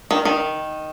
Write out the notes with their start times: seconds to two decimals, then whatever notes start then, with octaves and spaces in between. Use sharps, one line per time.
0.11 D#3
0.25 D#3